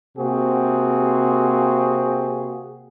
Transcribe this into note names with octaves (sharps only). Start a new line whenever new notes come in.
C3 A#3 C4 F#4 G#4